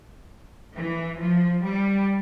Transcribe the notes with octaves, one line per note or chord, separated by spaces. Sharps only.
E3
F3
G3